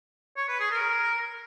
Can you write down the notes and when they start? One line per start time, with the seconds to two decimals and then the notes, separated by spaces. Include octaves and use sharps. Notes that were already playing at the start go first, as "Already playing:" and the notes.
0.37 C#5
0.48 B4
0.60 G#4
0.71 A#4